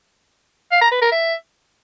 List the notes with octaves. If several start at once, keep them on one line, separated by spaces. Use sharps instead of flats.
F5
A#5
B4
A#4
E5